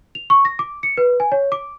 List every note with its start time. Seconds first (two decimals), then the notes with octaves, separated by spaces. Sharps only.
0.15 F7
0.30 C#6
0.45 A#6
0.59 D6
0.83 C#7
0.98 B4
1.20 G#5
1.32 C#5
1.52 D6